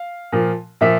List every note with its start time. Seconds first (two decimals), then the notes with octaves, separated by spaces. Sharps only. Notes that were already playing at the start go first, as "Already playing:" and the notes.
Already playing: F5
0.32 A#2 F3
0.81 A#2 F3 E5